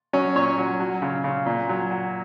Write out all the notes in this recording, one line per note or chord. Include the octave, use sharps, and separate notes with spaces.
F#3 C#4
A#2 C#5
F#3
F#3
C#3
C#3
A#2
F#3
F#3